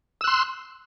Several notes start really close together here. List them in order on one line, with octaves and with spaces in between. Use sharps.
E6 F#6 C6